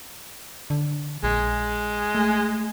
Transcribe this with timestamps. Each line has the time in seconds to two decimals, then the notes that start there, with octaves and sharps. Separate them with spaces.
0.70 D3
1.23 A#1 G#3
2.15 A3